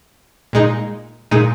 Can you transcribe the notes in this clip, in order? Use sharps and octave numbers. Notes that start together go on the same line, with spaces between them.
A#2 G#3 D#4
A#2 G#3 D#4